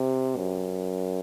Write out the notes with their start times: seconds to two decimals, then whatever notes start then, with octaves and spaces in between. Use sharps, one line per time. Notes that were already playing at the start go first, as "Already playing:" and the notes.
Already playing: C3
0.36 F#2